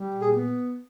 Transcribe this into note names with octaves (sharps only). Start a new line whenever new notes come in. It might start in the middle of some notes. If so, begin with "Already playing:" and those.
Already playing: G3
A#2
G#4
B3